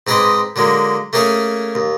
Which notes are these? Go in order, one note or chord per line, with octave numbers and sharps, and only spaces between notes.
G#2 C4 G#4 B4 D#5 D6
D3 F#3 G#3 A#3
A3 A#3 C#4 G#4 C#5 G#5
D#2